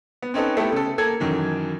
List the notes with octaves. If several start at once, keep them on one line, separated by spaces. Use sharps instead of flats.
B3
C4 C#4 D#4 A4 B4
A3 B3 E4 G4 A4
C#3 A4
A#3 A4 G#6
F#2 D#3 E3